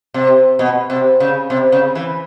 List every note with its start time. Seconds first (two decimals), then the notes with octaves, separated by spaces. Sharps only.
0.14 C3
0.59 B2
0.90 C3
1.20 C#3
1.50 C3
1.72 C#3
1.95 E3